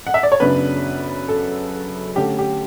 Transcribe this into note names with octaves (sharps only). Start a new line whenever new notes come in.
F#5
E5
D5
C#5
F#2 C#3 F#3 B3 D4 B4
A4
D3 A3 C#4 G4
G4